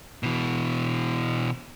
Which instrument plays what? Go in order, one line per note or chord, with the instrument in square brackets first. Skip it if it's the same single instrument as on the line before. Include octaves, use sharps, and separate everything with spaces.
[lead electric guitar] B2 E3